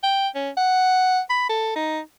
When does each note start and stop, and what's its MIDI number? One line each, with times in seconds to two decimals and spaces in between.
0.03 0.28 79
0.35 0.50 61
0.57 1.20 78
1.30 1.48 83
1.49 1.75 69
1.76 2.00 63